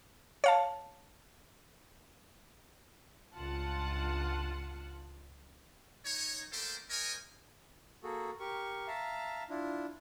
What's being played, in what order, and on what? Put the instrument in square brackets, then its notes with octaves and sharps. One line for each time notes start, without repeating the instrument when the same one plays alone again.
[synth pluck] C#5 F5 A5
[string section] C#2 G2 F4 F#5 A5
[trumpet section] D#4 C#5
A3 A#3 G4 A4 C5
A#4 C5 C#5 D#5 G#5
[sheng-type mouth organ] A#3 F#4 G#4 A4
G4 A#4 C#6
E5 F5 A5 A#5
D4 E4 F4